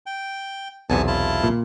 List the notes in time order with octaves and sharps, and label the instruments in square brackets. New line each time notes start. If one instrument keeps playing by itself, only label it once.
[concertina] G5
[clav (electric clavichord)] B1 E2 C3 [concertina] B3 G#5 A5
[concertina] E4 F4 A5
[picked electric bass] A#2